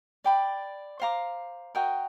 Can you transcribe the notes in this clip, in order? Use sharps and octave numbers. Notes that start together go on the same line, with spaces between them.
D5 G5 B5
C5 F5 A#5 D6
F#4 A#4 D#5 G5